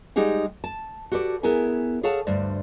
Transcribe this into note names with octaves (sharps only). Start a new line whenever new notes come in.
G3 G#3 D#4 G4 G#4 F#5
A5
F#4 G4 A4 B4 D5
B3 E4 G#4 A#4 G#5
G#4 A4 C#5 F5 F#5 A5
D2 G2 C5 D5